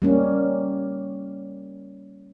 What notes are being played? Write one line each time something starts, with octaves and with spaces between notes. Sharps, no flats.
G3 A#3 C#4